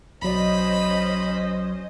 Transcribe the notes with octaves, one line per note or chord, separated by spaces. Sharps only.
B1 F#3 C#4 C5 D5 D#5 B5